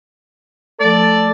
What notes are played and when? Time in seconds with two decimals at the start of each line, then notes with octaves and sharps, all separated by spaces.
0.80 F3 A3 A4 D5